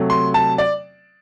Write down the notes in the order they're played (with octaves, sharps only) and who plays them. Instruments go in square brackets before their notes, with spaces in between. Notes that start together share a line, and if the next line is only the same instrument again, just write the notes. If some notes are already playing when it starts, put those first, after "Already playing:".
Already playing: [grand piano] C3 F#3 A3
C6
A5
D5